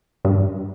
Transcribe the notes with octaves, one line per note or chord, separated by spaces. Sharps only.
G2